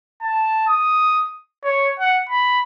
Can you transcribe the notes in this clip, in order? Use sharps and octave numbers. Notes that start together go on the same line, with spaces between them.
A5
D#6
C#5
F#5
B5